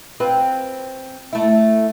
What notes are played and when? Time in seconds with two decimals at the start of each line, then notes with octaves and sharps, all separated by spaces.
0.20 C4 F4 B4
1.33 A3 E4